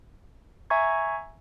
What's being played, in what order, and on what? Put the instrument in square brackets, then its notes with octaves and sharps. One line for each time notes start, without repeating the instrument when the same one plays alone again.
[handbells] E5 G#5 A#5 C#6 G#6